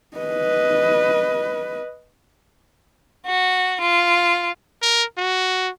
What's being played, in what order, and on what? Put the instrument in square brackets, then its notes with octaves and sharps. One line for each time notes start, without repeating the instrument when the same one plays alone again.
[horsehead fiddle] B4 D#5
[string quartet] F#4
F4
[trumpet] A#4
F#4